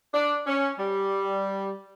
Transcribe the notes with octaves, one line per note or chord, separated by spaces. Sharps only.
D4
C#4
G3